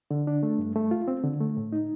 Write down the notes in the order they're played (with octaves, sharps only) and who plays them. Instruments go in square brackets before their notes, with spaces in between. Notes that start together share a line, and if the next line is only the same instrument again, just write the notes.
[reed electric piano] D3
D4
A3
G2
A3
F4
C4
D3
A3
A2
D#4